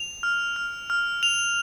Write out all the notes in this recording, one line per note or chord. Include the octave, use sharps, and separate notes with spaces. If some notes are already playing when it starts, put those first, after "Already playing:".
Already playing: F7
F6
F6
F6
F7